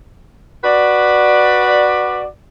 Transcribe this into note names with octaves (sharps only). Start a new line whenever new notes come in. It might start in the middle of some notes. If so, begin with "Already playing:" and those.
F#4 B4 D5